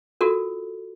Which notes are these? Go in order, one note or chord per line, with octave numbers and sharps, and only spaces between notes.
F4 F#4 A4 A#4